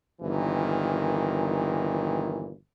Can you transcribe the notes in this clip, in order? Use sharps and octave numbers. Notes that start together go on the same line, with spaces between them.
G1 A#2 D#3 E3